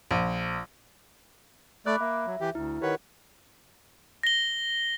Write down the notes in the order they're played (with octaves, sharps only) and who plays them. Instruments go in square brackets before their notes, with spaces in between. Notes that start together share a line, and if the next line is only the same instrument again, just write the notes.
[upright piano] A#1
[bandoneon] A3 D5 [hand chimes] B5 D6 F#6
[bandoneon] A#3 [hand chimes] E5
[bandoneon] F#3
E3 G4
[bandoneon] D2 [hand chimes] E4
[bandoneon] D#3 B4 C#5 [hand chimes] G4 A#4 F#5
[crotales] A#6 G7